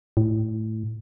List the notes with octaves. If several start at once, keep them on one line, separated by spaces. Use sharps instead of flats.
A2